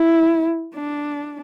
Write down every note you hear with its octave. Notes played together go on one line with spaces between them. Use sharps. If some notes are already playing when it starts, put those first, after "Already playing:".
Already playing: E4
D4